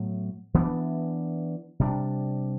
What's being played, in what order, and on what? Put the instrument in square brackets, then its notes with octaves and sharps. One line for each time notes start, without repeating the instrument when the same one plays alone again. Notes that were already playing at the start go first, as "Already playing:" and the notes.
Already playing: [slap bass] A2 F#3 B3
E3 B3 D4
C3 G3 D4